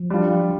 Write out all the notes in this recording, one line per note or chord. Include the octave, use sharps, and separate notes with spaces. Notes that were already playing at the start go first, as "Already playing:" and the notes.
Already playing: F3
G3 D4 F4